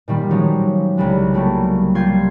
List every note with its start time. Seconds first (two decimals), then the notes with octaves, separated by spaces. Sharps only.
0.08 A#2 D#3 G3
0.31 F3 F#3 G#3 C#4 D#4 G4
0.97 C2 C#3 G3 G#3
1.34 F#3 G3 A3 A#3
1.95 G3 F4 G5 C6 G6 G#6